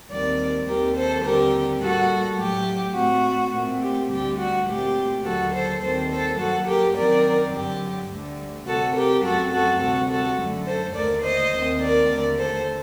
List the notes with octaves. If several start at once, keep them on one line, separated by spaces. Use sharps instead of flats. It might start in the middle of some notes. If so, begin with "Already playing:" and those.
D#2 D#3 G3 C4 A#4 D5
D#2 D#3 G3 C4 G4 A#4
A4 C5
D#2 D3 G3 C4 G4 A#4
A2 G3 A#3 F#4 A4
A2 F#3 A3 G4
A2 A3 C4 F#4
A#2 A3 C4
G4
D2 D3 G3 G4
F#4
A#2 A3 C4 G4
D#2 D3 F#3 F#4 A4
A4 C5
D#2 D#3 G3 C4 A4 C5
A4 C5
G2 F#3 A#3 F#4 A4
G4 A#4
F#2 D#3 F#3 C4 A#4 D5
G2 D3 F#3 G4
D2 D3 G3
C3 G3 C4 F#4 A4
G4 A#4
F#2 F#3 A3 C4 F#4 A4
F#4 A4
D2 C3 G3 F#4 A4
F#4 A4
F#2 D3 A3
A4 C5
D#2 D3 A3 A#4 D5
C5 D#5
D#2 D#3 A3 C4
A#4 D5
D#2 D3 A3
A4 C5